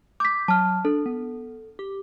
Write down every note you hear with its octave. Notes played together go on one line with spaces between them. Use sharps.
D6 G6 B6
F#3 A5 F6
D4 A4
B3
G4